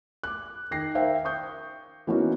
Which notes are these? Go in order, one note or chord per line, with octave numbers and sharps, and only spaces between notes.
D6 F#6
D#3 G5 A#6 C7
A#4 C5 E5 F5 G5
C#6 D#6 G6
E3 A#3 B3 C#4 D#4 F#4